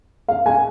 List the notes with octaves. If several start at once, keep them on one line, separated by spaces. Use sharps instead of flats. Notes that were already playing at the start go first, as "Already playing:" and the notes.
F5
G#5